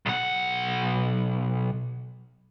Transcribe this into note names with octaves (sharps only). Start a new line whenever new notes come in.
B1 F#5